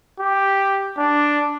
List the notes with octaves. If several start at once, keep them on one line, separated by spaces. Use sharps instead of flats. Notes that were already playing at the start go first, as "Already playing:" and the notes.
G4
D4